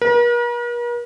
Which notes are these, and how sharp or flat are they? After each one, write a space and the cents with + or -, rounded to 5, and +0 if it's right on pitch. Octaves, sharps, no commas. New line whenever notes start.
A#4 +45